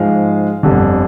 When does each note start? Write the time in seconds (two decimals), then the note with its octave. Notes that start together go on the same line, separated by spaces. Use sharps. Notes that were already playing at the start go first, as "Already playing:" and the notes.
Already playing: G#2 F3 G#3 F5
0.63 G1 F2 D3 G3